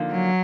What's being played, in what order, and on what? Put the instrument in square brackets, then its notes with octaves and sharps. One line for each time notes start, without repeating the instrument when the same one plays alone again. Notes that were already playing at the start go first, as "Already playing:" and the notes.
Already playing: [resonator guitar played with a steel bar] D3 F3 A#3 D#4
[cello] F#3